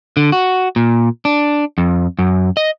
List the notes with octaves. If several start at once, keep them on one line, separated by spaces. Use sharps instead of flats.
D3
F#4
A#2
D4
F2
F#2
D#5